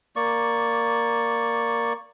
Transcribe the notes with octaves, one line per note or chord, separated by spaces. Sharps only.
A#3 D5 C#6